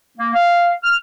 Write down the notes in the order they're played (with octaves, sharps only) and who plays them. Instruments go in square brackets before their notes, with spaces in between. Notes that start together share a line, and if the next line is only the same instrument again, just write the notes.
[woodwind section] A#3
F5
F6